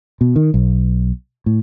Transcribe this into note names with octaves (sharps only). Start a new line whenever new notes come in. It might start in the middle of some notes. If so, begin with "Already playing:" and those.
B2
D#3
B1
A2